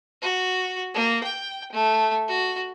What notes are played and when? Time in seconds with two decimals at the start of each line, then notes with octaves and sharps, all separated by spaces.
0.22 F#4
0.94 A#3
1.23 G5
1.72 A3
2.28 F#4